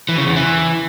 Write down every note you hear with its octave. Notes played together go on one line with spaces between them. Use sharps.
E3
C#3
E2
E3